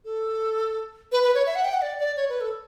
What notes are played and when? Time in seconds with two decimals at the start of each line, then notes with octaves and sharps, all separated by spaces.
0.05 A4
1.12 B4
1.23 B4
1.35 C#5
1.46 E5
1.55 F#5
1.65 G5
1.74 F#5
1.82 D5
2.00 D5
2.17 C#5
2.29 B4
2.41 A4